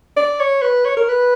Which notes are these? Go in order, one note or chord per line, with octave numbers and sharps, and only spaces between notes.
D5
C#5
B4
C#5
A#4
B4